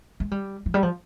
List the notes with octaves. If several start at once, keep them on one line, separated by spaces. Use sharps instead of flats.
G#3
G3
F3
G3
F3